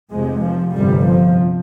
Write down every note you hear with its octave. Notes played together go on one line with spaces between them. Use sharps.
F1 F2 C3 G#3
F3
G1 F2 C3 G3
F3